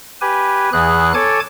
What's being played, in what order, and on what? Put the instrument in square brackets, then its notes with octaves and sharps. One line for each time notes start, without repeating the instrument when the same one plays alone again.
[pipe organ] G4 B4 G#5
E2 E3 G#4 F#6
A4 C#5 G#5 A5 D6 G#6